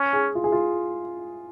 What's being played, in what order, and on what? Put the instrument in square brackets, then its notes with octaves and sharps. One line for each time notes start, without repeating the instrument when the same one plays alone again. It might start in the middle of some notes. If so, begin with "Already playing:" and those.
Already playing: [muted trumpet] C#4
[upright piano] G#4
F4
G#4
F4